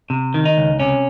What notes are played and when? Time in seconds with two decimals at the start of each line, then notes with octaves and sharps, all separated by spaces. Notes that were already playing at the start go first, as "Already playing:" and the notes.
0.10 C3
0.34 D#3
0.45 D#4
0.57 C#2
0.80 C3 C#4